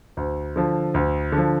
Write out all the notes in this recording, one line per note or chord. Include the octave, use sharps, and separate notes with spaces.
D2
D3 F3
D2
D3
F3